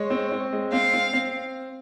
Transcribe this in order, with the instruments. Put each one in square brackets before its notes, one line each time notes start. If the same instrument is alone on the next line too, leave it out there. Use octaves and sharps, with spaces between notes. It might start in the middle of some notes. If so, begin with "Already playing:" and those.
Already playing: [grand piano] G#3 [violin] C#5
[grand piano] C4
C4
G#3
[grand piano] C4 [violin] F5
[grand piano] C4
C4